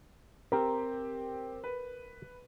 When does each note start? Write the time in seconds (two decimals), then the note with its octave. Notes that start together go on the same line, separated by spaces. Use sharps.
0.52 C4 G4 A#4
1.64 B4